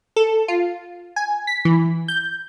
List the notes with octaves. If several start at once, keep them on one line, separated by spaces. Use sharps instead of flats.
A4
F4
G#5
B6
E3
G6